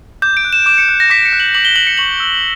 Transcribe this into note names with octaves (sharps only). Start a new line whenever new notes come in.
D6 G6
D7
F#6
E7
D6 E7
C#7
F#6
A#6
D6 B6
C#7
F#6
F#7
D6 F#7
G7
F#6 F#7
C#7
C#6 F#7
E6 G6